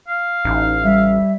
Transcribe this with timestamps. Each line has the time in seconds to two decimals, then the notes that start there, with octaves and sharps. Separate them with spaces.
0.08 F5
0.45 A1 D#4
0.84 G3 E5